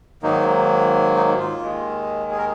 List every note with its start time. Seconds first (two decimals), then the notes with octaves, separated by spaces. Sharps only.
0.22 G#2 D#3 F#3 A#3 D#4
1.16 D#4
1.39 F4
1.61 D#2 D#3 G#3
2.31 G#4
2.38 A#4